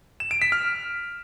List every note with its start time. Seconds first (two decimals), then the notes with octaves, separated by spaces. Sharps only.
0.20 E7
0.31 D7
0.42 B6
0.52 F6